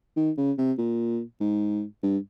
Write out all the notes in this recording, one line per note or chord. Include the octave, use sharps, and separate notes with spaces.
D#3
C#3
C3
A#2
G#2
G2